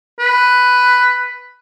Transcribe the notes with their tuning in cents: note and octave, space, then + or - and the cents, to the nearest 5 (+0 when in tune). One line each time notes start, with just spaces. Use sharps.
B4 +5